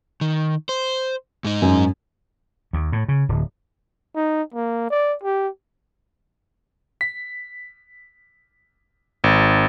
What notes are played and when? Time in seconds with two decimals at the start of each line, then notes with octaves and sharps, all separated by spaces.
0.21 D#3
0.69 C5
1.44 G#2 D#4
1.62 F#2
2.73 D#2
2.92 A2
3.08 C#3
3.29 D1
4.16 D#4
4.54 A#3
4.90 D5
5.24 G4
7.01 B6
9.24 G#1